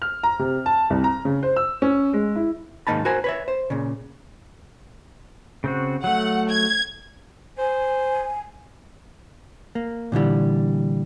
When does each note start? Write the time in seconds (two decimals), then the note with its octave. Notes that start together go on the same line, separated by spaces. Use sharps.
0.02 F6
0.23 A#5
0.39 C3
0.66 A5
0.90 C2
1.04 A#5
1.25 C#3
1.43 C5
1.56 E6
1.82 C#4
2.13 G#3
2.36 E4
2.87 G#2 D#3 A#3 D#4 A5 B5
3.05 F#4 A#4 C5 G#5
3.24 B4 C#5 E5
3.48 C5
3.70 A#2 C#3
5.64 C#3 C4 F#4
6.04 F#3 A3 F#5
6.49 G#6
7.58 C5 G#5
9.75 A#3
10.12 A#2 D3 E3 G3